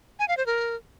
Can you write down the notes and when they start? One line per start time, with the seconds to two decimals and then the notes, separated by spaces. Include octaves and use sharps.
0.19 G#5
0.28 F5
0.37 C5
0.46 A#4